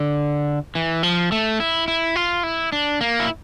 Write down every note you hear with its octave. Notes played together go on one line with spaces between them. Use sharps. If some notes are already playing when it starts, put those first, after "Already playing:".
Already playing: D3
E3
F3
A3
E4
E4
F4
E4
D4
A#3
E4